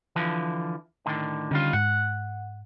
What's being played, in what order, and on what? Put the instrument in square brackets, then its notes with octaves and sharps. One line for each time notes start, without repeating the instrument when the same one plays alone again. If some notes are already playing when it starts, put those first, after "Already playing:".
[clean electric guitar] D3 E3 F3
A2 D3 D#3
[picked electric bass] D3 C#4 [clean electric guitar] D#3 G3 F4
[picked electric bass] G#2 [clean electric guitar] F#5